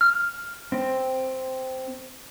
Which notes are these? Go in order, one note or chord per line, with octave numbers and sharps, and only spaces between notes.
F6
C4